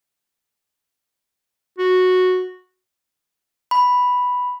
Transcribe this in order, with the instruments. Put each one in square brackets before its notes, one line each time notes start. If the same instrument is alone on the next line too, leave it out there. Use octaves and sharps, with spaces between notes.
[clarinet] F#4
[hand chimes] B5